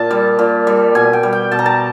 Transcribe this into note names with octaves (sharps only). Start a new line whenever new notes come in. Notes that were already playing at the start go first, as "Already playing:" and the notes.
Already playing: A#2 A5
G3
A#2
G3
B2 G#5
G5
G3
G5
B2 A5
A#5
A5